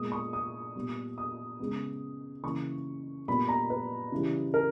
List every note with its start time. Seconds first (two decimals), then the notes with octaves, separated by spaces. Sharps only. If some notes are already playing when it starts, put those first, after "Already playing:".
Already playing: A#2 G#3 B3 D#6
0.12 C#6
0.33 D#6
0.76 A#2 G3 B3
1.18 D#6
1.59 C#3 G#3 B3
2.43 C#3 E3 A#3 C#6
3.28 A#2 G3 B3 B5
3.48 A#5
3.70 B4
4.12 C#3 E3 G3
4.54 A#4